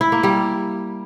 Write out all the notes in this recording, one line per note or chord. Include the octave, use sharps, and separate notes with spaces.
E4
A#3
G3